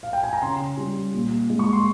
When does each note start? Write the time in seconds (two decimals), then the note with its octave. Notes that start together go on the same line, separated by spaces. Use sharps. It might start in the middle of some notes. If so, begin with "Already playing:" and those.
0.03 F5
0.13 G5
0.23 G#5
0.33 A#5
0.42 C#3 C6
0.77 G3
1.14 A#2
1.50 G#3
1.59 C#6
1.73 C6